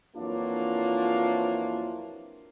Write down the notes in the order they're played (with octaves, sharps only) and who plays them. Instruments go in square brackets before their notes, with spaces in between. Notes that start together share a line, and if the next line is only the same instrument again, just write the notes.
[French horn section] F2 E3 F#3 A#3 D4 F4